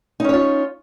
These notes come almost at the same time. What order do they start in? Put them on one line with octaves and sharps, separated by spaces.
D#4 C#4 C#5 F4